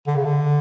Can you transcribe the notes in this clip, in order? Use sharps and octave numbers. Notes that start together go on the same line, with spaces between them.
D3
C#3
D3